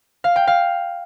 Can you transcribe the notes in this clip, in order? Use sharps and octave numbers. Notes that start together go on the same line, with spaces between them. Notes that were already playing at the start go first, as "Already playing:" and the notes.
F5
G5
F5